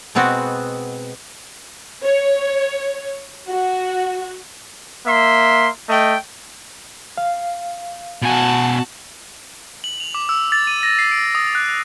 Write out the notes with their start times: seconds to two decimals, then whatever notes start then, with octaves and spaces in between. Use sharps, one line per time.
0.15 B2 G#3 B3 C4 F#4
2.03 C#5
3.48 F#4
5.07 A#3 E5 C6
5.89 A3 D#5 G5
7.17 F5
8.22 B2 F#4 G#5 A5
9.84 F#7
10.00 F7
10.15 D6
10.29 E6
10.52 A6
10.67 D#7
10.83 A#6
10.99 C7
11.11 D7
11.35 D#6
11.55 F#6